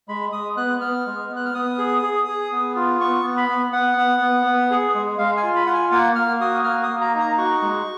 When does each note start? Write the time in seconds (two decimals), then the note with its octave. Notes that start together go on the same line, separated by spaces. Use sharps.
0.08 G#3 B5
0.32 G#3 D#6
0.57 B3 F#6
0.81 B3 F6
1.06 G#3
1.30 B3
1.36 F#6
1.45 F6
1.54 B3 D#6
1.78 G#4
2.02 G#4
2.28 G#4
2.52 B3
2.76 F4
3.00 B3 C#6
3.24 B3
3.37 B5
3.48 B3
3.73 B3 F#5
3.97 B3
4.21 B3
4.46 B3
4.71 G#4
4.94 G#3
5.18 G#3 F5
5.37 G#5
5.43 F4
5.56 B5
5.66 F4 F#5
5.73 G#5
5.92 A#3 F#5
6.15 A#3 F6
6.40 F#4 D#6
6.64 A#3 F6
6.83 D#6
6.89 A#3
7.01 A#5
7.14 D#4
7.19 A#5
7.38 F#4 C#6
7.62 G#3